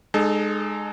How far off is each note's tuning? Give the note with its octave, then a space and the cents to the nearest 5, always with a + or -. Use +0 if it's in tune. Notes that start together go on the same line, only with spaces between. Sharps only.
G#3 +0 D#4 -35 A4 -20